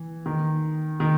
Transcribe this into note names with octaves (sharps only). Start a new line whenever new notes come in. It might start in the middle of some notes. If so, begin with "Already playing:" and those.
Already playing: E3
D#3
D#3